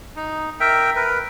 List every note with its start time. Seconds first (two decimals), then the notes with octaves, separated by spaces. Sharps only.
0.16 D#4
0.60 A#4 E5 G5
0.96 A#4 B4